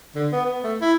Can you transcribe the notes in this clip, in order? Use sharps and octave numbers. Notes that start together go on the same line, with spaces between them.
D3
B3
B3
A3
E4